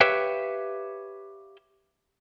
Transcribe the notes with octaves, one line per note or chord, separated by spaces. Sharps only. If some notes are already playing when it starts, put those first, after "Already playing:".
G4 B4 C#5 E5 F5 G5